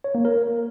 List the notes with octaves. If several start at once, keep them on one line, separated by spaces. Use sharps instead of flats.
C#5
A#3
A#4